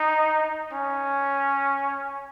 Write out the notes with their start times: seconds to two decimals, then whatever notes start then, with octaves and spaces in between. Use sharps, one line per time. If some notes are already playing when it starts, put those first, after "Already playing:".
Already playing: D#4
0.73 C#4